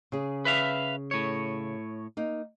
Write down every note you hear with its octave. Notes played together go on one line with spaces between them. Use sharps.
C#3 G#4
B4 E5 F5
A2 C#5
A#3 D#4